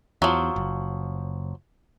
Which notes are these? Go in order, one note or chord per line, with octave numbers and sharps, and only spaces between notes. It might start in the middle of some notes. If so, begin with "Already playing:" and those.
E2 F3 F#3
F#1